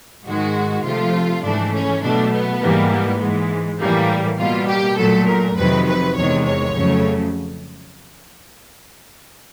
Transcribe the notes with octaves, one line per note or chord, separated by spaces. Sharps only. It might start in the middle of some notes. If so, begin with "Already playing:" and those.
G#2 D#3 G#3 F#4
C3 F3 A3 F4
G#2 E3 A3 D4
C#4
B2 F#3 A3 D4
B3
G#2 E3 G3 A#3
B3
G#2 E3 G#3
A2 E3 G3 A#3
B2 G3 A#3 F4
G4
A#2 F#3 A3 A4
A#4
F2 C3 D#3 F#3 B4
B4
E2 C3 D#3 G#3 C#5
C#5
F2 C#3 F#3 A3